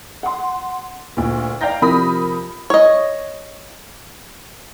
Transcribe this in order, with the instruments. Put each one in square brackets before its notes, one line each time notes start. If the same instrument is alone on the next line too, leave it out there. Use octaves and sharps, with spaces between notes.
[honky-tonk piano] F#5 C6
D2 A#2
D5 F5 G5 A#5 G6 A#6
C3 F3 A#4 B5 D#6 A#6
[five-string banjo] C#5 D#5